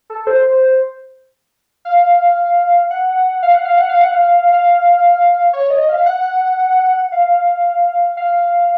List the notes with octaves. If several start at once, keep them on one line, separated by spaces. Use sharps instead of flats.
A4
C5
F5
F#5
F5
F#5
F5
F#5
F5
F#5
F5
F5
C#5
D#5
F5
F#5
F5
F5